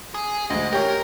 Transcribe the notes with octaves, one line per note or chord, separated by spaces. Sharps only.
G#4
D2 G#3 D#5
G4 A#4 C#5